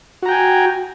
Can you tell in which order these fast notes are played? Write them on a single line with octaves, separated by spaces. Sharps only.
F#4 A#5 G5 G#5